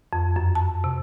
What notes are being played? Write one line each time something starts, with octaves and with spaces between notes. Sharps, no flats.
F2
F#2
A5
C3